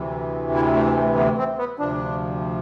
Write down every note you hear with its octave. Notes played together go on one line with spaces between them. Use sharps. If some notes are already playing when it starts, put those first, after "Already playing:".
Already playing: D2 C3 E3
E4
A3
A3
B3
C4
B3
D2 C3 F3 D4